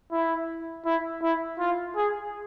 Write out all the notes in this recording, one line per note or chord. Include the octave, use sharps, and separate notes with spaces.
E4
E4
E4
F4
G#4